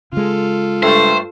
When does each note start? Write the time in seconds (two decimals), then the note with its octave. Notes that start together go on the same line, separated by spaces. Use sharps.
0.12 C#3 G#3 F4 A4
0.83 G2 A3 C5